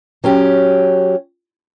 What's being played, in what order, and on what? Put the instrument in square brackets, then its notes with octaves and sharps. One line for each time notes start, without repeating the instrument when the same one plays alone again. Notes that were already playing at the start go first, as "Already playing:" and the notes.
[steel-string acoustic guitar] F#3 C#4 G4